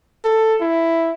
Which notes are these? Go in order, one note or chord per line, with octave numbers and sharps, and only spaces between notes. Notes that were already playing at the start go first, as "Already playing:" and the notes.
A4
E4